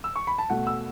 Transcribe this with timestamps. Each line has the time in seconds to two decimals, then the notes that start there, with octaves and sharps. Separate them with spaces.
0.04 E6
0.16 C#6
0.27 B5
0.38 A5
0.50 B2 A3 F#5
0.67 E6